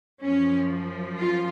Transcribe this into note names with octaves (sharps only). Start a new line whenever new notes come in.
F#2 F3 C#4
F4